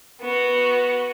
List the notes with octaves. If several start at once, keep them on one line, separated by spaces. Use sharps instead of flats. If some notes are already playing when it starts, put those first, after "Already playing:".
B3 F#4